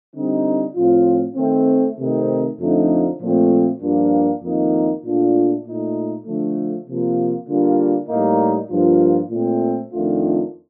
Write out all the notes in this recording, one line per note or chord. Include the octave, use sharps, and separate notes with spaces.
D3 G3 C4 D#4
A2 F3 C4 F4
D#3 A3 C4
C3 D#3 A3 C4 D#4
F2 D3 F3 A3 D#4
A#2 F3 A3 C4
G2 F3 A#3 D4 F4
F2 D#3 A#3 D#4
A#2 A3 D4 F4
A#2 A3 D#4
D3 F3 A3
C3 F3 A#3 F4
D3 G3 A#3 D4 F4
A2 G3 A#3 D#4
G2 F3 A#3 F4
A#2 A3 C4
F2 D#3 A3 D4 F4